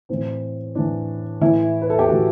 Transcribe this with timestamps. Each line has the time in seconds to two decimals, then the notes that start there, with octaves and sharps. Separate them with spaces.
0.09 A2 E3 C4
0.75 A2 E3 D4
1.41 A2 E3 E4
1.82 B4
1.90 A4
1.99 G4
2.07 A2 E3 F#4